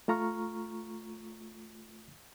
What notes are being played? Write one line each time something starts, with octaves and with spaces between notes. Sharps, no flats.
A3 F4 A#5 C#6 F6